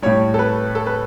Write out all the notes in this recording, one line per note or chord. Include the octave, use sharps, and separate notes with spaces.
A2 G3 C#5
A4
B4
A4
B4